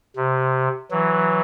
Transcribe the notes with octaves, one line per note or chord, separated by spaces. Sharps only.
C3
E3 F#3